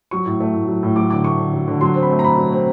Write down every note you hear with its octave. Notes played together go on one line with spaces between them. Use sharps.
F#3 C#6
A2
A3
A2
F#3
A2
F#3 D6
D3 D6
A3 C#6
D3
F#3
D3
F#3 C6
C4
B5
A3
A#5
B2 B5
F#3
C4